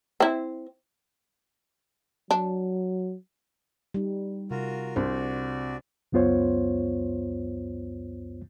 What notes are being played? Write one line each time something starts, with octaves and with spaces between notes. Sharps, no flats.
C4 E4
F#3 D4
G3 D#4
C3 F4 F#4 A#4
C2 D4 F#4 C5 D5
C#2 F#2 B3 F4 C5 C#5